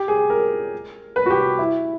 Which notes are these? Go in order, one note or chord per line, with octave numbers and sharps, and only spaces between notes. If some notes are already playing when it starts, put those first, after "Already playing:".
Already playing: G4
G#4
A#4
B4
F#4
G4
E4